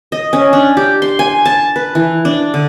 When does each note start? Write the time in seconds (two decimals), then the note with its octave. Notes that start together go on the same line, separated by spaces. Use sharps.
0.12 D#5
0.33 C#4
0.53 D4
0.77 G4
1.02 C6
1.19 G#5
1.45 A5
1.76 B4
1.95 E3
2.25 D4
2.54 D3